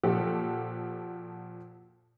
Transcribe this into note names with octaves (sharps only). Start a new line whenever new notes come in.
A#2 F3 F#4 G4 A4